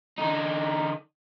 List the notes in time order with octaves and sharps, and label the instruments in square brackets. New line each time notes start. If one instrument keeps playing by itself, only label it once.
[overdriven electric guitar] D3 D#4